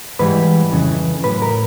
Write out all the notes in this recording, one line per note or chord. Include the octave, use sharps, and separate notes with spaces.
G#2 E3 G3 B4
F2 C#3 E3
A2 F#3 B4
A#4